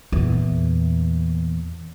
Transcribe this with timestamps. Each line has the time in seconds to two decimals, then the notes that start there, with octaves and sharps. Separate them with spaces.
0.12 E2 A#2